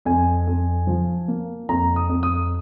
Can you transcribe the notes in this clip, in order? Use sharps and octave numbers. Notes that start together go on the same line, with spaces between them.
F2 G#5
F2
F3
A#3
F2 A#5
D#6
F2
D#6